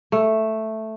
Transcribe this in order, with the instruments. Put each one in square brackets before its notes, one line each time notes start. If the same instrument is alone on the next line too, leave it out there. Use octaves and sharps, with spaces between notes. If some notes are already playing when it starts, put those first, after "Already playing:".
[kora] A3